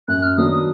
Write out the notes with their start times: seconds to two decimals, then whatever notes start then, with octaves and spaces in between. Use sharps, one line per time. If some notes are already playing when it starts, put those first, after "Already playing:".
0.08 F#2 F#6
0.23 F6
0.37 D#3 F#3 B3 D4 D#6
0.52 D#6